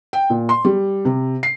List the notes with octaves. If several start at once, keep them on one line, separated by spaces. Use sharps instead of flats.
G5
A#2
C6
G3
C3
C7